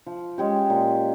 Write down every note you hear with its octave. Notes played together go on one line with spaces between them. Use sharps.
F3
G#3 C#4 G4
A#2